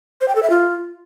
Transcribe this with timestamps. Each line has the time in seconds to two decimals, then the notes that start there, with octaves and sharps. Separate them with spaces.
0.21 C5
0.28 G5
0.35 A4
0.43 E5
0.50 F4